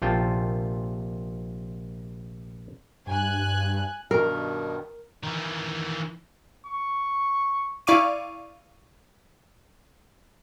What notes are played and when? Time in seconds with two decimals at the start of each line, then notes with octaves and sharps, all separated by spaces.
0.02 A#1 C3 F4 G5 A5
3.07 G2 G#5 F#6
4.11 G2 B2 D#3 A#4
5.23 D#3 E3
6.67 C#6
7.87 E4 D5 F5 C#6 D6 D#7